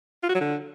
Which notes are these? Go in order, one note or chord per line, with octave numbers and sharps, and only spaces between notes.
F4
F#4
F#3
D3